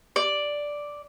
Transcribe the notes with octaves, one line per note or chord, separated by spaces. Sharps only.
D5